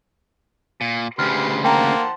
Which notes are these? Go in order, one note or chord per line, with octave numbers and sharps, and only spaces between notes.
A#2
D2 C#3 G4 B4 C6 F6
A#3 C5 F#5 G5 A5 A#5